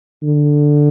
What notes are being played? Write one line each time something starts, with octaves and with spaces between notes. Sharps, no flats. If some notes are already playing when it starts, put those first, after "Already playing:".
D3